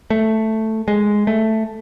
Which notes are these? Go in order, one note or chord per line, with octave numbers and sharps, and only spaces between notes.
A3
G#3
A3